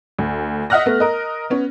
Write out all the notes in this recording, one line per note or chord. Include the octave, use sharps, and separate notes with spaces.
D2
D#5 E5 F#5 F6 F#6 A#6
A3 B3
A#4 D#5
B3 C#4